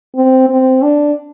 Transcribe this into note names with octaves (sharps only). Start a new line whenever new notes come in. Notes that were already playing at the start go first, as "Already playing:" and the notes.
C4
C4
D4